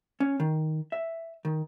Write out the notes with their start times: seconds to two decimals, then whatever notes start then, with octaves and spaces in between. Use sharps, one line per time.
0.20 C#4
0.40 D#3
0.92 E5
1.45 D#3